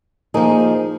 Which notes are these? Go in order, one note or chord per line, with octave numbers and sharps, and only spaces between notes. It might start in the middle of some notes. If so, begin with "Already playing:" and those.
F3 A#3 D#4 G#4